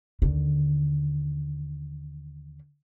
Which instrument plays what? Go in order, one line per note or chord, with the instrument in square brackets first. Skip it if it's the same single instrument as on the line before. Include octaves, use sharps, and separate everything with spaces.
[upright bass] D#2 D3